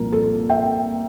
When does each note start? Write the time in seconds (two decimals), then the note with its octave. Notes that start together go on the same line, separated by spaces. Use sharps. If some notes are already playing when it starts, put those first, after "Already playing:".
Already playing: C2 A#2 F3 A#3 A#4
0.13 A4
0.49 E5 G5